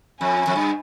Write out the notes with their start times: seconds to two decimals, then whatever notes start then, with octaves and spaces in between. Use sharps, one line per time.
0.20 F2 G#5
0.47 F2
0.56 G2